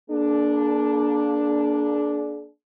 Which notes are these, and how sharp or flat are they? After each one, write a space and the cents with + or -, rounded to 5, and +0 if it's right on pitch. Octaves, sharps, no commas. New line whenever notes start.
A#3 +20 D4 +0 G#4 +45